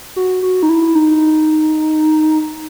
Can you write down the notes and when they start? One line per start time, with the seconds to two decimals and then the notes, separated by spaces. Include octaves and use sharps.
0.16 F#4
0.42 F#4
0.63 D#4
0.69 E4
0.95 D#4